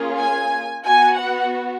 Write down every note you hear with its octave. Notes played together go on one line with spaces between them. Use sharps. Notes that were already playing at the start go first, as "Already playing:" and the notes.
Already playing: A#3 C#4 F4 G#4
G#5
B3 F#4 G#5
F#5